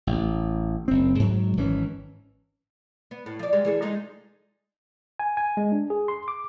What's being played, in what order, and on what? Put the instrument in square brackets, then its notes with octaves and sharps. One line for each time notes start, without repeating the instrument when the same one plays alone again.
[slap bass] A1
F#1 C4
G#2 F#3
G#1 E3 C#4
[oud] B3
A2
F3 D5
G3 G#3
E3 G#4 A4
G#3 D#4 F4
[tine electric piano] G#5
G#5
G#3
D4
G#4
C6
D6